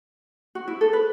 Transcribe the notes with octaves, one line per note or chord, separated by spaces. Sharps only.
F#4
E4
A4
B4